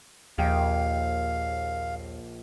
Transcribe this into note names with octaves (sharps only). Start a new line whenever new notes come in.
A#1 D#2 G#4 F5 G5